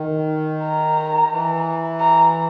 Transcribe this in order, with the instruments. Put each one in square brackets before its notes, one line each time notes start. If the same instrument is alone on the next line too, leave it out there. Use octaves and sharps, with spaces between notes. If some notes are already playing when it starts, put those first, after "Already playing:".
Already playing: [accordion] D#3
[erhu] A#5
[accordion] E3
[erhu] A#5